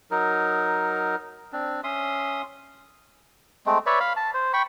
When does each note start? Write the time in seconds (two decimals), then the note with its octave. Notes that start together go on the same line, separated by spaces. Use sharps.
0.11 F#3 D#4 A#4
1.52 C4 D4
1.84 C#4 E5 C6 D#6
3.66 G#3 A3 C4
3.86 B4 C#5 D5 E5
4.00 F5 B5
4.16 A5
4.34 C5
4.53 G5 B5 C#6